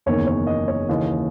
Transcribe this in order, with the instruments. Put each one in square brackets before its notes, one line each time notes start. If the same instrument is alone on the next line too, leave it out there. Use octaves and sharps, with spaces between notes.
[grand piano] F#1 E2 D#3 C#5
C#5
D#5
C#5
D#2 C#3 E3 D#5